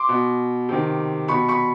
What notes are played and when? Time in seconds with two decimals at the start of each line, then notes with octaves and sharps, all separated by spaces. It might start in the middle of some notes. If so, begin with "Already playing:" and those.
Already playing: C6 D6
0.09 B2
0.69 C3 D#3
1.28 B2 B5 C#6
1.48 B5 C#6